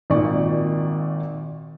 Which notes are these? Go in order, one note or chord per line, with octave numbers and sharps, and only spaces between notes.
G#1 A#2 D#3 D5 C#6